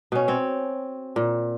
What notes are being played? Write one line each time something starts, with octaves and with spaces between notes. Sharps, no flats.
B2 C#4
C4 C#5
A#2